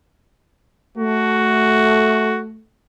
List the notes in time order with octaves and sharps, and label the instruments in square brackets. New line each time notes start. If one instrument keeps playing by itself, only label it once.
[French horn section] A3 [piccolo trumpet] F#4